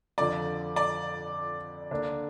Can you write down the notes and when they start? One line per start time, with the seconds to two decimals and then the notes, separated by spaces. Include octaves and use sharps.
0.18 F2 D3 F3 D5
0.76 D5
1.91 D3 A#3 D4